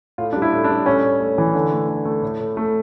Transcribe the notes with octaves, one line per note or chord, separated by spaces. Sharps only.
A2 F4
G3 D4
E4
A2
D4
G3
A2 C#4
A2
A3
E3
D3
A3
D3
A3
A2
A2
A3